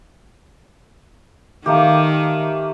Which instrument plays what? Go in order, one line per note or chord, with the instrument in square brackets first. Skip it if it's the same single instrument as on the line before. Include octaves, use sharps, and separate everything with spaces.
[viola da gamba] D#3 [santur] A3 A#3 G4